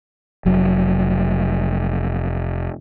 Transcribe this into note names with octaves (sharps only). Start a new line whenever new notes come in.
F1 F#3